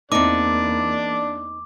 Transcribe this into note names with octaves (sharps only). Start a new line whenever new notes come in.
E2 A#3 C4 D4 D#4 D5 D6